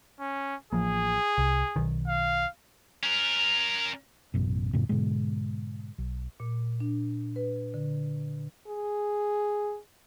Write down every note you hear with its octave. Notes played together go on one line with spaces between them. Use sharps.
C#4
A1 F3 A#3 G#4
C2
B1 D#3
F5
C#4 A#4
A1 F#2 B2
F2 A2 C#3
G#2 B2 D3 G#3
B1
A#2
D4
B4
D3
G#4